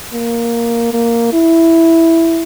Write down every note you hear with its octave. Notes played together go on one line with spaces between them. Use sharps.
A#3
A#3
E4